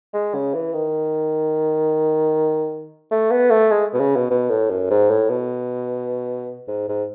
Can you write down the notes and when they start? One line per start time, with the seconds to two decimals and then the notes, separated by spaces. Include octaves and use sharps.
0.14 G#3
0.34 C#3
0.54 E3
0.73 D#3
3.11 A3
3.31 B3
3.51 A3
3.71 G#3
3.94 B2
4.00 C#3
4.16 B2
4.30 B2
4.50 A2
4.70 F#2
4.90 G#2
5.10 A2
5.29 B2
6.68 G#2
6.89 G#2